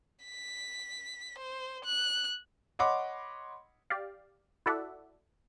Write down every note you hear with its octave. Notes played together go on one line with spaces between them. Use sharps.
B6
C5
F#6
C#5 D#5 F#5 B5 C6 D6
G4 D5 F5
E4 F#4 A4 D5 E5 F#5